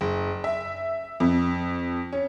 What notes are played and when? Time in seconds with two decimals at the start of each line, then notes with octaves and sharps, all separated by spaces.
0.01 F#1
0.44 E5
1.20 F2
2.13 C#4